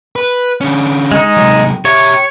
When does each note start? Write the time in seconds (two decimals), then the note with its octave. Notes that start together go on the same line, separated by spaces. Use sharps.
0.16 B4
0.61 D3 C#4
1.12 G#3 D#4
1.37 C3 F#3
1.85 G4 C#5 E5